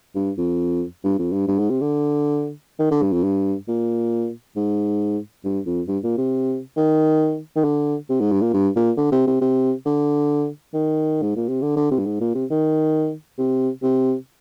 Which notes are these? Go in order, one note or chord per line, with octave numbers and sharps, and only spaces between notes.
G2
F2
G2
F2
G2
G2
G#2
C3
D3
D#3
D3
G2
F2
G2
A#2
G#2
G2
F2
G2
A#2
C3
D#3
D#3
D3
C3
G#2
G2
A#2
G2
A#2
D3
C3
C3
C3
D3
D#3
G#2
A#2
C3
D3
D3
C3
G2
G#2
A#2
C3
D#3
C3
C3